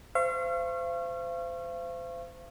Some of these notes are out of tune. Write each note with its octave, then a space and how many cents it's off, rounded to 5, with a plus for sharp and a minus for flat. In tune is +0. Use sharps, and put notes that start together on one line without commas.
C5 -25 F5 -40 C#6 -25